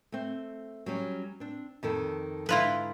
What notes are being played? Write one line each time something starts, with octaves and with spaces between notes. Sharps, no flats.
A3 C4
F#3 G3 C#4
C4 D4
F2 D#3 A4
G#2 D3 E4 F4 B4